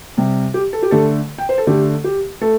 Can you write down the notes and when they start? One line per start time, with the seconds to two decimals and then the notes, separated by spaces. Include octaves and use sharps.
0.17 C3 G3
0.54 G4
0.73 A4
0.83 G4
0.91 D3 A3 A4
1.38 G5
1.49 C5
1.58 A4
1.67 D3 A3 G4
2.04 G4
2.41 A3 A4